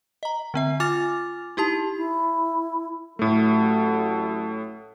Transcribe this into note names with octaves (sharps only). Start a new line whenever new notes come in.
D#5 A#5
D3 C4 E5
F4 G#5 D6 F6 A6 F7
D#4 E4 G4 A5
E4
A1 A2 F#3 A3 A4